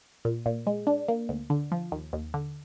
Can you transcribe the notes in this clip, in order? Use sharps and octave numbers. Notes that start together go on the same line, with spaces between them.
A#2
A#2
G#3
D4
A#3
D2
D3
F3
D#2
D#2
D3